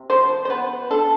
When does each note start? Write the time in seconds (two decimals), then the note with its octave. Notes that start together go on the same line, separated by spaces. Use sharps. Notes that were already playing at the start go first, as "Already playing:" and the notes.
Already playing: C3
0.10 F3 C5
0.45 C5
0.50 B3 B4
0.91 D4 A4